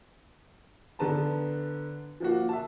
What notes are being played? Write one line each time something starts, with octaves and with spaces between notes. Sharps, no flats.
D3 B3 B4 A5 A#5
F3 A#3 F#4
E5 A5